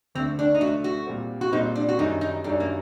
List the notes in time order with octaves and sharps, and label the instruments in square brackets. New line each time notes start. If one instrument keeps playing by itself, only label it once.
[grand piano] D2 D3 A3 [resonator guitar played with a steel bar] C4
[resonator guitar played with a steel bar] D4
D#4
[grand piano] D2 D3 A3 [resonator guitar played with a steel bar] F#4
[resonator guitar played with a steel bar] F#4
[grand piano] A#2 G3 C4
[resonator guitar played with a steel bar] F#4
[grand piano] A#2 G3 C4 [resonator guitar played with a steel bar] D#4
[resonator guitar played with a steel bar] D4
F#4
[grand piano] F#2 D#3 G3 [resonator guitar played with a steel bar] D#4
[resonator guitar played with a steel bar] D#4
[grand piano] F#2 D#3 G3 [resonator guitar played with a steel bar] D4
[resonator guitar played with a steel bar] A#3